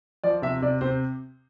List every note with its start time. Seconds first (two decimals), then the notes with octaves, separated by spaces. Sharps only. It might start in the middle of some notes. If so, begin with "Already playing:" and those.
0.24 F3 D5
0.42 C3 E5
0.62 C3 D5
0.81 C3 C5